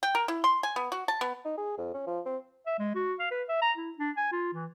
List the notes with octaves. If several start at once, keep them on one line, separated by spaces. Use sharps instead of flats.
G5
A#4
E4
C6
G#5
B3
F#4
A5
B3
D#4
G#4
F2
C#4
F3
C4
E5
G#3
F#4
F5
B4
E5
A#5
E4
D4
G#5
F4
E3